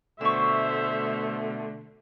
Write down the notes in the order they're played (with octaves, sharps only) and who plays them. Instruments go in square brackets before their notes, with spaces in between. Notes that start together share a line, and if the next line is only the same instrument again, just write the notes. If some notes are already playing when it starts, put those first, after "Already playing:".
[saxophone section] B2 D3 A3 [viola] C5 E5 [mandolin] C#6 E6